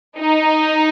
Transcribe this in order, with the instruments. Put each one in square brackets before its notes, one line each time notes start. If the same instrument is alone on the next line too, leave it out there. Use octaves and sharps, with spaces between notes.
[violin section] D#4